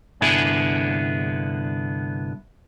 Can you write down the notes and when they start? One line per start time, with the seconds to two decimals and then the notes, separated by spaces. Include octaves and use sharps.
0.21 C2 G2 D3 B3 E4 G#4